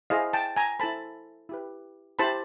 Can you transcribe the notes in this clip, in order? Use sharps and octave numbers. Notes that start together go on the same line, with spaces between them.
E4 G#4 C5 D#5 F5
G5 A5
G#5 A#5
E4 A4 C5 A5 B5
E4 G4 B4
E4 G4 C5 A5 B5